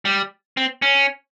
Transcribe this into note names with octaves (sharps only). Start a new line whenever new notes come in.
G3
C4
C#4